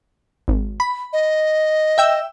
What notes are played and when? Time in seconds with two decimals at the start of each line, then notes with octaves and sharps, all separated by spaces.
0.48 G#1
0.80 B5
1.13 D#5
1.98 E5 G5 E6